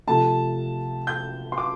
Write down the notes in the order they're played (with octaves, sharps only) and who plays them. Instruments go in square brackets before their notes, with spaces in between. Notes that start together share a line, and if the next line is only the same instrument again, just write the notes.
[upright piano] C3 F3 A3 A5
G6
C6
D6